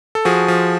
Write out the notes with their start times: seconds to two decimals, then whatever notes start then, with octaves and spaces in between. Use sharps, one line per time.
0.15 A4
0.25 F3 F#4 G#4
0.48 F3